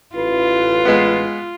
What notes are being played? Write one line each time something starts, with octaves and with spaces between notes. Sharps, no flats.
A1 F4 B4
G#3 B3